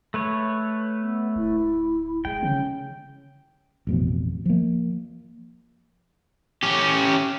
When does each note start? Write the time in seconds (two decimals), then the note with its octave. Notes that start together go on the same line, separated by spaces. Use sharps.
0.14 A3 B4 C#5
1.00 B3
1.36 D1 E4
2.25 E1 G#3 G5
2.43 C#3 C#4
3.87 A1 F2 B2
4.46 F3 A#3
6.63 C#4 G4